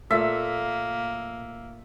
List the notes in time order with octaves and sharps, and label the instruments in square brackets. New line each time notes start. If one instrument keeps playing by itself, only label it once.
[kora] A#2 A3 A4 [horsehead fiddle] A#3 [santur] E5